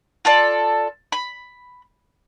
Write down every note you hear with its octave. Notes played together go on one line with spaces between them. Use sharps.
F4 A4 D5
B5